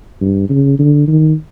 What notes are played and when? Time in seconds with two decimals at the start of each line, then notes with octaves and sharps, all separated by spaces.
0.21 G2
0.49 C#3
0.79 D3
1.08 D#3